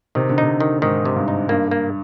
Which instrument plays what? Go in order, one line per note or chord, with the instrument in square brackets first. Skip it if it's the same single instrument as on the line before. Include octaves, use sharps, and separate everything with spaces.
[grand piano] C3 [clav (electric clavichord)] D#3
[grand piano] D3
[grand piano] C3 [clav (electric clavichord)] D#4
[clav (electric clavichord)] D#3
[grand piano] G#2 [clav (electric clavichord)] D#3
[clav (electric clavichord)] C3
[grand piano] G2
[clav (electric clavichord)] D#4
[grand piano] G2 [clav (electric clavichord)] A#3
[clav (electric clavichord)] A#3